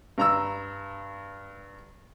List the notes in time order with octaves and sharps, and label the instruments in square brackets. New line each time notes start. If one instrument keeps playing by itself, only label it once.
[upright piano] G2 A#5 E6